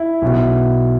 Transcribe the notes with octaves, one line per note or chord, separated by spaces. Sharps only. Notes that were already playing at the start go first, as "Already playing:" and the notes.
Already playing: E4
B1 B2